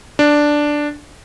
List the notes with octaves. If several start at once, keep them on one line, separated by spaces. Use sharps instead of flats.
D4